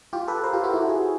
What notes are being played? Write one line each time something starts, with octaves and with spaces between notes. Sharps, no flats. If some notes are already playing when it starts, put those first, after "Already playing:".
F4 G4
A4 B4
A#4 C5
F4 G4
E4 F#4
E4 F#4
F#4 G#4